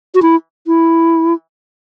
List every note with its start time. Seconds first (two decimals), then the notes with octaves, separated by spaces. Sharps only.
0.15 F#4
0.22 E4
0.67 E4